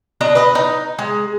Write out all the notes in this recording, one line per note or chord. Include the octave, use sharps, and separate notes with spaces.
D4 D#5 A#5
B4 D#5
D#4
G#3